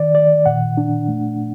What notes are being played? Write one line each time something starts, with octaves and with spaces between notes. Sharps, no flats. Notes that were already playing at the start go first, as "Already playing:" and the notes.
Already playing: D#3 D5
D#3 D5
A#2 F#5
D4
A3